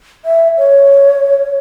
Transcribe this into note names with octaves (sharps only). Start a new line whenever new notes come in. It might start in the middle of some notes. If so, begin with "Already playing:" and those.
E5
C#5